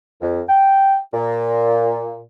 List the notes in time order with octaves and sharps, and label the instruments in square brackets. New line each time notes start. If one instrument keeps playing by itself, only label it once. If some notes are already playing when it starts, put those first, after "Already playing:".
[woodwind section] F2
G5
A#2